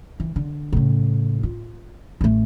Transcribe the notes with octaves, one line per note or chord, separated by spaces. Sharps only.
E3
D3
A2 C#3
F4
A1 A3